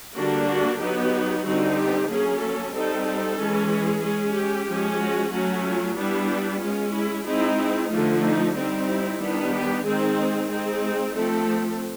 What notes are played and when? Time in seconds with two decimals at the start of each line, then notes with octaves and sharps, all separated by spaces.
0.15 D3 G3 A#3 D4 F#4
0.48 F#4
0.80 F#3 B3 D#4 G4
1.45 D3 G3 C4 D#4 F#4
1.77 G4
2.09 F#3 A#3 C#4 G#4
2.41 A4
2.74 G3 C4 D#4 A4
3.06 A4
3.39 E3 G#3 C#4
3.71 G#4
4.03 G#3 C#4
4.36 G4
4.68 F3 G#3 C#4
5.01 F#4
5.32 F#3 A3 C#4 F#4
5.65 F4
5.97 G3 B3 D4 E4
6.61 G#3 C#4 F4
6.94 E4
7.26 G#3 C4 D#4 E4
7.58 E4
7.90 D3 F3 A3 F4
8.24 D#4
8.55 G3 C4 D#4
8.88 E4
9.20 D#3 G3 B3 D4
9.52 G4
9.84 D#3 G#3 C4 D#4 G#4
10.17 G#4
10.49 G#3 C4 D#4
11.14 F3 A3 C4 A4